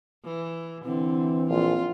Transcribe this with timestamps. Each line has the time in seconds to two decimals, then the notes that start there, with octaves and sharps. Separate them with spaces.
0.24 E3
0.85 D3 E3 C4
1.50 A#1 F4